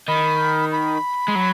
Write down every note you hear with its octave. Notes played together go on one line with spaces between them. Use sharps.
D#3 B5
B5
G#3
F#3